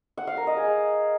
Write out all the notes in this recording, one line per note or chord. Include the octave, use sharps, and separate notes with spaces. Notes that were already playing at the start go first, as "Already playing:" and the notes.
F#5
F5
A#4
D#5
G#4